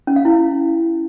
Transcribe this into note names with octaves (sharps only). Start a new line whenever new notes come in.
C#4
F5
E4